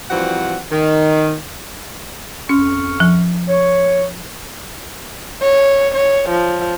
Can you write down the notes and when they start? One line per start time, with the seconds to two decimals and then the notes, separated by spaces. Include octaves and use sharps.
0.10 E3 F3 G3 C4 F#4 F#5
0.72 D#3
2.49 F2 C#4 C#6 F6
3.00 F3
3.48 C#5
5.42 C#5
5.95 C#5
6.30 F3